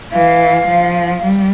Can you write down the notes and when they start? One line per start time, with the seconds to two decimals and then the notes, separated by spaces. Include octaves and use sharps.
0.11 E3 F5
0.66 F3
1.23 G3